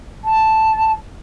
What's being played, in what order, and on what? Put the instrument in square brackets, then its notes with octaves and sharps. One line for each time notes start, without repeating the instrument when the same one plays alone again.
[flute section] A5